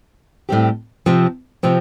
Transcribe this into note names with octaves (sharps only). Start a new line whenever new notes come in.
A2 G3 C4 G4
C3 F3 C4
C3 F3 C4